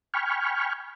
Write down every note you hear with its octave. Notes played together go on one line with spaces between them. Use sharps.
G5 G#5 B5 C#6 F6